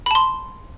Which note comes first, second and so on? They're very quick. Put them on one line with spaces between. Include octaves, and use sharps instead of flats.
B5 A5 C6